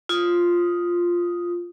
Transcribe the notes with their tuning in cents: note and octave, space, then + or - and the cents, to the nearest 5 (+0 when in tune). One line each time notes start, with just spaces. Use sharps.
F4 +0 D#6 +0